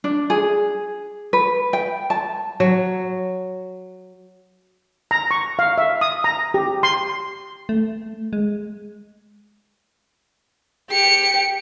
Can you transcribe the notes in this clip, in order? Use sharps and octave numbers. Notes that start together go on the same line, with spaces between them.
D4
G#4
B4
G5
A5
F#3
A#5
C#6
F5
E5
D#6
A#5
G4
C6
A3
G#3
G4 C#7